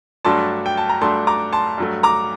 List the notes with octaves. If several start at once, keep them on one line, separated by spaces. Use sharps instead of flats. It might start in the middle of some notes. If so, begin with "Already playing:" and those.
G2 F#3 A3 D4 A5 C6
G5
A5
A#5
G2 F#3 A3 D4 A5 C6
A#5 D6
A5 C6
G2 F#3 A3
A#5 D6